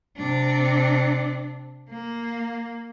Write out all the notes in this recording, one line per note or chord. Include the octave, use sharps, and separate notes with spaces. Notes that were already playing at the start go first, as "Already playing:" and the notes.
C3 D4
A#3